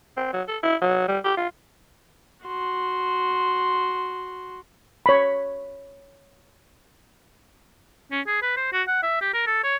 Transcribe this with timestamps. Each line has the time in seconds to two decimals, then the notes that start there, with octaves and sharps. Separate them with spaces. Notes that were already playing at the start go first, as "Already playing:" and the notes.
0.17 C4
0.33 F#3
0.48 A4
0.63 E4
0.82 F#3
1.08 G3
1.24 G4
1.37 F4
2.45 F#4 C6
5.06 C#5 B5
8.11 C#4
8.27 G#4
8.42 B4
8.57 C5
8.73 F#4
8.87 F#5
9.03 E5
9.21 G4
9.34 A#4
9.47 A4
9.64 C#5